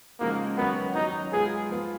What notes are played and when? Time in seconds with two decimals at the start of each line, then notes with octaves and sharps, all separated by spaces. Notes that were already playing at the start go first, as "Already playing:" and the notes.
0.20 C#3 F3 G#3 A#3 D#4 F#4
0.57 D#3 F#3 B3 C#4 F#4
0.95 F#3 C#4 D#4 F#4
1.33 G#3 B3 F4 G#4
1.70 F3 B3 F4